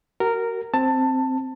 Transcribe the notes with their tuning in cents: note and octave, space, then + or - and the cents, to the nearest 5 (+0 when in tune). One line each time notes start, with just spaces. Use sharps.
F#4 +35 A#4 -10
C4 +0 A5 +15